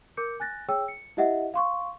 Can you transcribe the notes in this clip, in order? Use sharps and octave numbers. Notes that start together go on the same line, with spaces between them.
A#4 D6 G6 C#7
G#5 F#6 A6 A#6
G#4 C#5 G5 E6
C#7
E4 G4 D#5 E5 F#5
F5 C6 C#6